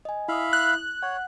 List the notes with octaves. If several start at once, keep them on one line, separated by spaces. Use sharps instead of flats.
D#5 G#5
E4 E5 F5 B5 D#6
F#6
C#5 F#5